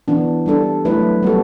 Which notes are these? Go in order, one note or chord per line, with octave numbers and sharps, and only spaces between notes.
E3 B3 D4
G3 D4 A4
F#3 A3 E4 B4
G3 B3 F#4 A4